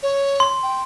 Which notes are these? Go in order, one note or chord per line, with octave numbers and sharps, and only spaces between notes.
C#5
C6
G5